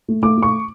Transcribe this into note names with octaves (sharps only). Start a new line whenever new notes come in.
A3
A3 D6
A3
C#6